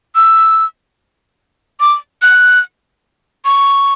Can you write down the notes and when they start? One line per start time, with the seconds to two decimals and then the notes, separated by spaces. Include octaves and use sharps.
0.15 E6
1.80 D6
2.22 F#6
3.45 C#6